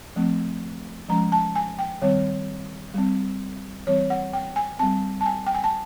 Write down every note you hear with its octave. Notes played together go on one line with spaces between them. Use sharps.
F3 A3 C4
F3 G#3 C#4 A#5
A5
G#5
G5
D#3 G3 C4 C#5
G3 C4
E3 G3 C4 C#5
F#5
G5
G#5
G3 C4 A5
A5
G#5
G5
G#5
A5